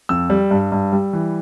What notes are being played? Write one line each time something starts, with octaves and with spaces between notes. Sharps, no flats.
F2 E6
G3
G2
G2
G3
E3